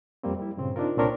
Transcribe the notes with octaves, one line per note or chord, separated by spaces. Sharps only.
F2 G3 A#3 C4
G3 E4
G2 A#2 C#3 C4
C4 D4 D#4 F4 A#4
C2 A#2 C4 D4 A#4 C#5